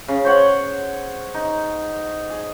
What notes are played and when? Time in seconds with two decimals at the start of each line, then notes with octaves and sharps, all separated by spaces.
0.08 C#3
0.25 C5 C#5 F#5
1.34 D#4
2.30 G#4